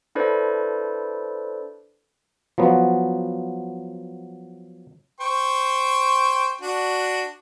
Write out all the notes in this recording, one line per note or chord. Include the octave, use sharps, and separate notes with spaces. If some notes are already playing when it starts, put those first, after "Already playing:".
D4 E4 A4 B4 C5 D5
F3 F#3 B3
C5 G5 C#6
D4 F#4